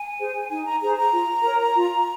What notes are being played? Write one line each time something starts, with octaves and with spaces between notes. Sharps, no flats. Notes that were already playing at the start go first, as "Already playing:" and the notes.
Already playing: G#5
G#4 C5
D#4 G#5
A#5
G#4 C5 A#5
A#5
F4
A#4 C#5
F4